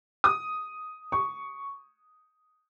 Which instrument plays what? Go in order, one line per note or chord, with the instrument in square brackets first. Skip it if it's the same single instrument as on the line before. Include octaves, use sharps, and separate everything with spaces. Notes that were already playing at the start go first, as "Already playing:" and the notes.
[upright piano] D#6
C#6